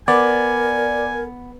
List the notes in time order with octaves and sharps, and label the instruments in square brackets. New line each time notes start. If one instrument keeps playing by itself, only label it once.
[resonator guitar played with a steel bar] B3 [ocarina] A#4 [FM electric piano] D5 [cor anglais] G#5